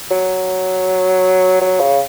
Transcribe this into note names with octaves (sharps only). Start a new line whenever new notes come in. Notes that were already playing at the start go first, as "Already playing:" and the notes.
F#3
F#3
C#3